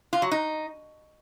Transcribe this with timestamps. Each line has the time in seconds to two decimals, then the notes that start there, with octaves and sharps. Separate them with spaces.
0.13 F4
0.22 F#3
0.31 D#4